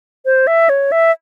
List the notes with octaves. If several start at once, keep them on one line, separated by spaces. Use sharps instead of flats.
C5
E5
C#5
E5